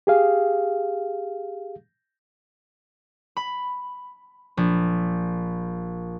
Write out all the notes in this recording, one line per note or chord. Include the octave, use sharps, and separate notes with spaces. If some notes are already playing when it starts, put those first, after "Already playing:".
G4 G#4 F5
B5
A#1